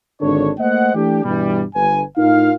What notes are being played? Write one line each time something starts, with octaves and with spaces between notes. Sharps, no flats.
G#1 D3 D4 A4 C#5
A3 A#3 C5 D#5 F#5
E3 A3 D4 G4
G2 B2 E3 G3
G1 B4 G#5
A2 D#4 F4 A#4 F5